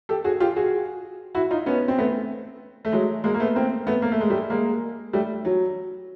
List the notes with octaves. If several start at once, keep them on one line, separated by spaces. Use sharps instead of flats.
G4 A4
F#4 G#4
F4 G4
F#4 G#4
E4 F#4
D#4 F4
B3 C#4
C4
A3 B3
A3
F#3 G#3
G#3 A#3
A#3
A3 B3
A#3 C4
A3 B3
A#3
A3
G#3
G3 A3
G#3 A#3
G3 A3
F#3